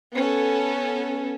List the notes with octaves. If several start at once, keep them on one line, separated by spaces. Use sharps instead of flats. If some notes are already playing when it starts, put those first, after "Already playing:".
B3 C#4 A4